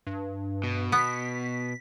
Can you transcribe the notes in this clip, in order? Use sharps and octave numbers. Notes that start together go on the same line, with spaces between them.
G2
B2
B3 B6